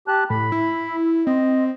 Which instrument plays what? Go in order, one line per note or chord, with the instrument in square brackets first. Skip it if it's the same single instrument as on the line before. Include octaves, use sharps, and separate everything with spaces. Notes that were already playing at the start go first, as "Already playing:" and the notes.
[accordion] G4 A5 F#6
[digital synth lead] A2 [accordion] B5
[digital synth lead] E4
[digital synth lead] C4 [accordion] D#5